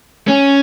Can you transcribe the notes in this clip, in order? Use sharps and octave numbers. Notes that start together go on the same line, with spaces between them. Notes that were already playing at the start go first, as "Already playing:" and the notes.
C#4